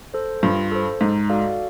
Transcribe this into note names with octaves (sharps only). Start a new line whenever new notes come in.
A4 C5
G2 F4
A4 C5
G#2 D#4
F#4 A4 D5 F5